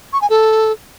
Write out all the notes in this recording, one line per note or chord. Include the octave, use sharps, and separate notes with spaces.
C#6
G#5
A4